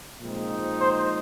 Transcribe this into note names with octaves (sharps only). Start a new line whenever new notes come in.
A#2 F3 G#3 C4 D#4
C5